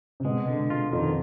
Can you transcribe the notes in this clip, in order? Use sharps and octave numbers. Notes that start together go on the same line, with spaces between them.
C3
B2 G#3
D3
F4
F2 D#3